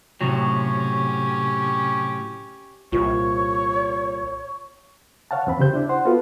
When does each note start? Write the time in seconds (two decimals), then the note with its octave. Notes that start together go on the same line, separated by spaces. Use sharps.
0.21 A2 C3 F#3 C#4 G4
2.92 C2 A#2 C#5 C#6
5.31 C#5 F5 F#5 A5
5.47 E2 C4 B5
5.59 C#3 G4 C5 G6
5.73 D4 E4
5.89 C5 F#5 C6
6.05 B3 F4 F#4 A4 B4